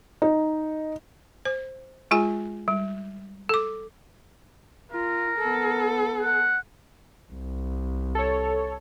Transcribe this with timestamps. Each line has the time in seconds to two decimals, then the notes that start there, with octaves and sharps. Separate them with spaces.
0.22 D#4
1.45 C5
2.11 G#3 F4 G#4 G#5
2.68 G3
3.49 A4 D6
4.91 F4 A#4
5.38 B3 A4
6.22 F#5
7.33 C2
8.15 A4 C#5